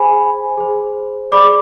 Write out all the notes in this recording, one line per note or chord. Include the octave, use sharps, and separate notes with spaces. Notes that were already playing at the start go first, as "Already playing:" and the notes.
Already playing: G#4 C5 G#5 B5
G#4 C5
G#4 D5 B5 D6